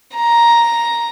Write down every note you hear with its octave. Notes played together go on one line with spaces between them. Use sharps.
A#5